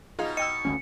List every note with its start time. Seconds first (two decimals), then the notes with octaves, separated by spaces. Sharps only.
0.19 B2 D#4 F4 G#4 F5
0.37 D#5 G5 E6 C#7
0.65 G#1 D2 G#3 C#4